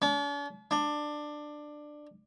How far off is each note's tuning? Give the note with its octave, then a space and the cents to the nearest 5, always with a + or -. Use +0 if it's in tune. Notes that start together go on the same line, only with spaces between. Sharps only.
D4 -45
D4 +15